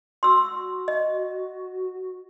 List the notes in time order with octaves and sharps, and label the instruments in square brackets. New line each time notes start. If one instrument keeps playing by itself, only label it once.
[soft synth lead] F#4 [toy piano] C6 E6
[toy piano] D#5